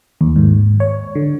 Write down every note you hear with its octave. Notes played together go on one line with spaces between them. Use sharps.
D#2
G#2
C#5
D3